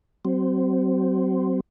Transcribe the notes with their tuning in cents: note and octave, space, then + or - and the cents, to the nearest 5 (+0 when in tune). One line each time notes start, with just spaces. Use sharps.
F#3 +35 C4 -10